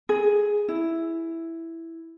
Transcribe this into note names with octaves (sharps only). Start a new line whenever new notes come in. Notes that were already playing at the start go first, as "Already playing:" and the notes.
G#4
E4